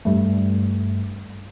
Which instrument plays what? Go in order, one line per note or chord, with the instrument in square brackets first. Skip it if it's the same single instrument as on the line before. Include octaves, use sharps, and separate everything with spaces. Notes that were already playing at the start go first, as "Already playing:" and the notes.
[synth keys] G2 G3 A3